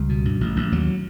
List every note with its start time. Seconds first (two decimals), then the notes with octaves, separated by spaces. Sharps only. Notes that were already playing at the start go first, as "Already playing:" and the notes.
Already playing: C#2 G3
0.09 B2
0.25 G2
0.41 A1
0.56 A1
0.72 D#2 F#3